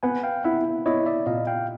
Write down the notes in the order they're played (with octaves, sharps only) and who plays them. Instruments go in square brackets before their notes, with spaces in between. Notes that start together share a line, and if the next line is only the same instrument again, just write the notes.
[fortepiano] B3 [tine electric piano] F#5 G#5
[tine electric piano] F5 G5
[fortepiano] E4 [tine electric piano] E5 F#5
[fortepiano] E4 [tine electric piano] C#5 D#5
[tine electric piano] D5 E5
[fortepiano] A#2 [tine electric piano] D#5 F5
[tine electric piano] F5 G5